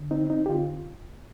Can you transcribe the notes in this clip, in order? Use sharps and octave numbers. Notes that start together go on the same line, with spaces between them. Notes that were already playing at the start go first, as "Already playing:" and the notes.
Already playing: D3
C4 D#4
C4 D#4
G4
D3 F4